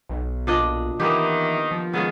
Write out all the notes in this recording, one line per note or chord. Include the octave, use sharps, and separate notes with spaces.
B1
A#2 D4 D#5
D#3 E3 A#3 B3 G4
F3
D#3 G#3 B3 C#4 F4